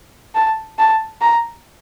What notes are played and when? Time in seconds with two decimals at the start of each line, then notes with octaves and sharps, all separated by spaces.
0.35 A5
0.79 A5
1.21 A#5